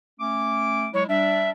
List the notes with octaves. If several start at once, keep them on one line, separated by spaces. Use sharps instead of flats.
A3 C#4 D6
F#3 G#3 E4 C#5
G3 D4 E5